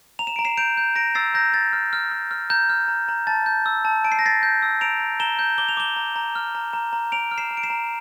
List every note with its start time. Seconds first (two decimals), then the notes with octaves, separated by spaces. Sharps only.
0.19 A#5 F7
0.27 E7
0.36 A#5 D7
0.45 C7 E7
0.57 G6 D7 F7
0.77 G6
0.96 A#5 A#6 D7
1.15 E6 A6 C7
1.34 A#5 G6 A#6
1.54 A#5 A6
1.73 F6
1.93 F6
2.12 F6
2.31 F6
2.50 A#5 G6
2.69 F6
2.88 A#5
3.08 A#5
3.27 A5 A6
3.46 G6
3.66 E6
3.85 A5
4.04 A5 D7
4.12 C7
4.19 A#6
4.23 A5 A6 C7
4.43 G6
4.63 E6
4.81 A#5 D7 F7
5.00 A#5
5.20 A#5 E7 G7
5.39 G6
5.58 D6 G7
5.69 F7
5.77 D6 E7 G7
5.96 A#5
6.16 A#5
6.36 F6
6.55 A#5
6.73 A#5
6.93 A#5
7.12 A#5 D7 F7
7.31 F6
7.38 C7 E7
7.51 A#5
7.57 D7
7.63 C7 E7
7.70 A#5